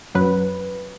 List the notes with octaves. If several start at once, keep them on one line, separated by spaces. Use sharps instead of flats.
F#2 F#3 B4